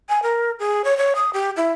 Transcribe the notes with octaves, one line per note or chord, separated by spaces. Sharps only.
G#5
A#4
G#4
C#5
C#5
D#6
G4
E4